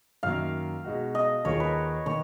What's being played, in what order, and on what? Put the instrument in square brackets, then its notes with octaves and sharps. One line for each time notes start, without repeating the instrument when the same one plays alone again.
[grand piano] F#2 D#3 A#3 [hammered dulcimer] F5
[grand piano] B2 G#3 D#4 F#4
[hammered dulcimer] D#5
[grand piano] D#2 D#3 A#3 F4 G#4 [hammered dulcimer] C#5
[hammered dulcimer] B4
[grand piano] D#3 A#3 [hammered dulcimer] C#5